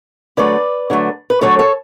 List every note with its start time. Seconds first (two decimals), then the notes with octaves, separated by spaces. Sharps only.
0.37 D3 F#3 A3 B4 D5
0.90 D3 F#3 A3
1.30 B4
1.41 D3 F#3 A3 A4 C#5
1.59 A4 C#5